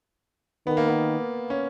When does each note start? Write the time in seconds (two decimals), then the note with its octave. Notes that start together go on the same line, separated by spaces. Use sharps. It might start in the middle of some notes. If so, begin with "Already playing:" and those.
0.67 D#3 B3
0.77 A#3
0.88 B3
1.50 C#4